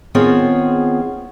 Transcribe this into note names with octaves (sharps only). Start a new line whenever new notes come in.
D#3 B3 C4 F4 G#4 C#5